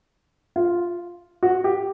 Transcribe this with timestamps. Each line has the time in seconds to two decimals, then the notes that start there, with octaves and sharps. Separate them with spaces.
0.56 F4
1.43 F#4
1.64 G4